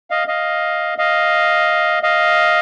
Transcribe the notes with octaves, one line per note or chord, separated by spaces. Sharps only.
D#5 F5
D#5 F5
D#5 F5
D#5 F5